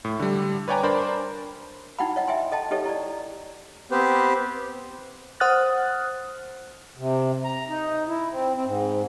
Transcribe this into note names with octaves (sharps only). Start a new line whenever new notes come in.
A2
D3 G3
B4 C#5 D5 G5 G#5 A#5
D4 A#4 C5 D5 B5
D#4 E4 F#4 F#5 G5 B5
C#5 D#5 F#5
E5 G5 G#5 C6
A4 D#5 G5 A5
D#4 G4 A4 C#5 D#5
E4 D5
B3 C4 G4 B4 C5
C5 F#5 D#6 F6 F#6 A6
C3
A#5
D#4
E4
C4
C4
G#2